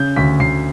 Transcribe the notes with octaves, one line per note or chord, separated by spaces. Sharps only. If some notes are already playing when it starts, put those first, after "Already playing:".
Already playing: C#3 G6
D2 B6
D2 C7